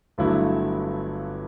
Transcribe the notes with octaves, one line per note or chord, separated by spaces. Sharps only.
G1 G2 F#3 A3 E4